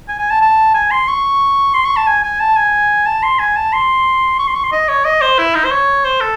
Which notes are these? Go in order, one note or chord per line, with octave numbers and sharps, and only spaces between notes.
G#5
G#5
A5
A5
G#5
C6
C#6
C6
C#6
A5
G#5
G#5
A5
G#5
A5
C6
G#5
A5
C6
C#6
C6
C#6
C6
D#5
C#5
D#5
C5
E4
D#4
C5
C#5
C5
A4